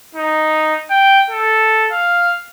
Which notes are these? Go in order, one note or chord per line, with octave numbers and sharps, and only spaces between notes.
D#4
G5
A4
F5